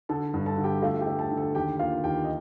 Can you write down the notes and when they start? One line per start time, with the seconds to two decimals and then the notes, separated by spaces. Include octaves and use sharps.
0.09 D3 A4 A5
0.34 G2
0.46 A4 A5
0.58 D3
0.64 G4 G5
0.82 A3 F4 F5
1.01 G4 G5
1.07 A3
1.19 A4 A5
1.31 D3
1.37 A4 A5
1.55 D#2 G4 G5
1.79 A#3 F4 F5
2.04 D#2 G4 G5
2.24 D#5